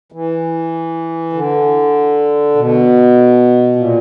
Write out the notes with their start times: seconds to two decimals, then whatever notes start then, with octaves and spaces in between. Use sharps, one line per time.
0.12 E3
1.33 D3
2.55 B2
3.76 A#2